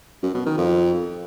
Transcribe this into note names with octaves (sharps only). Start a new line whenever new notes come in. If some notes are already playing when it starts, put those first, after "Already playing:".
F#2
B2
D#3
F2